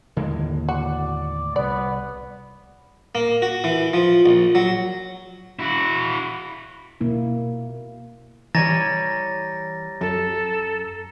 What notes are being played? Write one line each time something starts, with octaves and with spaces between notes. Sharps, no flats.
D#2 A2 D3 G#3 A#3
F#4 D5
C2 B3 D5
A#3
F#4
E3
F3
A#1
F#3
E4 F#4
B2 A#3 E4
E3 G3 C#5 G#5 A#5 A6 A#6
F#2 A4